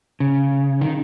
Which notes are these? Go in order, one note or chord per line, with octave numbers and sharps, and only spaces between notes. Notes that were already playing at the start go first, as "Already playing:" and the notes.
C#3
D#3